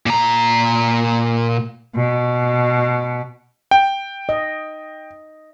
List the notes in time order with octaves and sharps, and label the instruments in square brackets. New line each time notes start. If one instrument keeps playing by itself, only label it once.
[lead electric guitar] A#2 A#5
[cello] B2
[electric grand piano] G5
[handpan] D#5